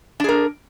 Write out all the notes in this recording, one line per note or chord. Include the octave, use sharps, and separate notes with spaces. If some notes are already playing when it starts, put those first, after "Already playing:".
D4 G#4 A#4